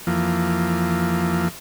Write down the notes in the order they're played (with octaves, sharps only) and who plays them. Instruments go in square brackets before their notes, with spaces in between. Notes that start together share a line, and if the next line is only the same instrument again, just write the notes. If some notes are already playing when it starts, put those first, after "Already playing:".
[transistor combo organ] F2 E3 F3 A#3